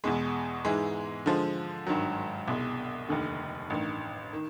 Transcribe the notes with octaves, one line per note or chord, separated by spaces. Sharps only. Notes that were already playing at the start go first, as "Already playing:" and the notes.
E2 B2 G#3
G#2 E3 G#3
D3 F3 G#3
G#1 G2 D#3 F#3
C2 B2 G#3
F1 D#2 D3
A1 G2 D#3
D#3